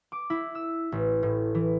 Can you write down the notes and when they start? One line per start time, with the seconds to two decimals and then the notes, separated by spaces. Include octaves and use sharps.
0.12 D6
0.30 E4
0.55 E6
0.92 A1
1.23 A2
1.55 E3